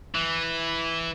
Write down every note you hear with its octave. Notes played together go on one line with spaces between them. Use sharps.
E3